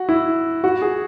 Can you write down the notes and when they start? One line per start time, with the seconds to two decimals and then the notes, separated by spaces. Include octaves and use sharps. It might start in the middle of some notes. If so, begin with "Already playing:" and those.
Already playing: F#4
0.09 E4
0.64 F#4
0.82 G#4